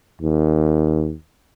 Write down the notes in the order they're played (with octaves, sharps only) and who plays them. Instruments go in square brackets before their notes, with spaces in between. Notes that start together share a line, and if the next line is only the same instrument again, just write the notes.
[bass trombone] D#2